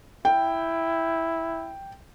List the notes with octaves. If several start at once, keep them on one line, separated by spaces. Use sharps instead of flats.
E4 G5